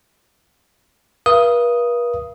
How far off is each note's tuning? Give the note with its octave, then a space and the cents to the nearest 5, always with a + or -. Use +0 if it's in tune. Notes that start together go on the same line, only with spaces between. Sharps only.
B4 -45 F5 -40 D#6 +0